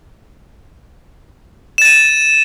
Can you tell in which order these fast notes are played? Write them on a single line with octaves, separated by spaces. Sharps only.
E7 A6 D#7